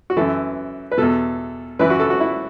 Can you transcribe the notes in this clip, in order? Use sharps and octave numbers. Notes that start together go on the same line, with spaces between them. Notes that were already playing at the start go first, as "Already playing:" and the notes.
F#4
F#2 E3 A4
B4
E2 B2 A4
F#2 E3 B4
F#4
A4
F#4
E4